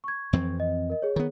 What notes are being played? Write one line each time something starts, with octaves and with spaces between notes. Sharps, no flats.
C#6 G#6
F2 E3 C4
D#5
A#4 D#5
G#4 C#5
D#3 B3